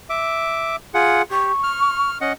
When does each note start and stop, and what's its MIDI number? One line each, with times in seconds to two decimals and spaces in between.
0.10 0.76 76
0.10 0.76 86
0.94 1.22 65
0.94 1.22 68
0.94 1.22 78
1.31 1.52 67
1.31 2.13 85
1.63 2.18 89
2.21 2.33 61
2.21 2.33 75
2.21 2.33 78